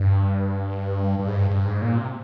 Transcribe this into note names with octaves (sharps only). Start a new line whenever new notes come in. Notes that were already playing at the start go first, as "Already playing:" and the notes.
Already playing: G2
G2
G#2
G2
G2
G#2
A#2
C3